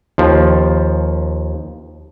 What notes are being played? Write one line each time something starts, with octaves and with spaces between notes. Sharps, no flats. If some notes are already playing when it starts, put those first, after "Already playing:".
D#2 F3